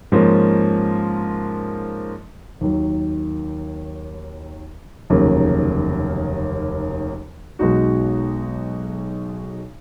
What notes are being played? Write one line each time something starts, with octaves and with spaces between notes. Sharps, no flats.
G#2 F3 A#3 C#4
D#2 D#3 F#3
F1 D#2 C#3 F#3 A#3
B1 B2 G#3 D#4 F#4